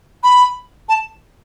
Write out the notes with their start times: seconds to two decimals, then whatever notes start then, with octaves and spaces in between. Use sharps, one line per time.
0.23 B5
0.89 A5